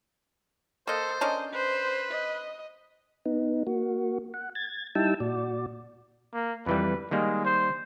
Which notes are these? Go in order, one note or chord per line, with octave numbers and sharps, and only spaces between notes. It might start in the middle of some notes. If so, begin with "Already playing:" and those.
A#3 A4 C5 D#5
C#4 D4 A#4 D#5
B4 C5
D#5
B3 D#4
A#3 F#4
F#5
G#6 A6
G3 D#4 E4 G5 A5 E6
A#2 F#4 D5
A#3
F2 E3 G3 B4
D#3 G3 G#3 A#3
C5